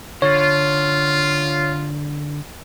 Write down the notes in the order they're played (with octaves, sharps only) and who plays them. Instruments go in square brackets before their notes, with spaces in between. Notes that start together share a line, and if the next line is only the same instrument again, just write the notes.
[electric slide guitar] D3 [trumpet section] F4 [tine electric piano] C#5